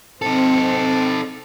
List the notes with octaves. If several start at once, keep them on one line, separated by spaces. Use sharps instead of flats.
C4 D#4 A4